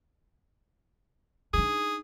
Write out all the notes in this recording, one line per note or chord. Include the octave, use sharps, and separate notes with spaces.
D4 D#4 G#4